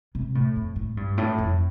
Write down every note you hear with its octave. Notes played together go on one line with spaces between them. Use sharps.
C3
A2
F2
A2
G2
A2
F2